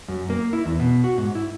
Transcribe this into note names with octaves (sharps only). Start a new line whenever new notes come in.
F#2
A#3
E4
E2
B2
F#4
G#2
E4